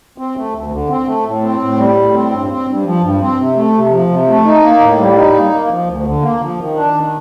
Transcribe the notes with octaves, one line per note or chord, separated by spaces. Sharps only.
C4
A3
D2
D3
C4
A3
A2
C4
A2
G3
A2
C4
G2
C4
G2
F3
G2
C4
C3
A3
C3
F3
C3
A3
D#4
A#3
A2
G3
D#4
A#3
A#3
F3
D2
D3
A#3
F3
D#3
D4
D#3